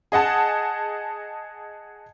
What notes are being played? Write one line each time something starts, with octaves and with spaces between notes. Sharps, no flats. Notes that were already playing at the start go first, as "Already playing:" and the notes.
G#4 D#5 F#5 A5